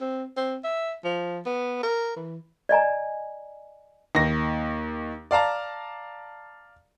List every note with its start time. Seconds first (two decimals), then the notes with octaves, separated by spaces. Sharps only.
0.01 C4
0.37 C4
0.64 E5
1.04 F3
1.46 B3
1.83 A#4
2.16 E3
2.69 D5 D#5 G#5 A#5
4.15 D#2 A#6
5.31 D5 F5 A5 A#5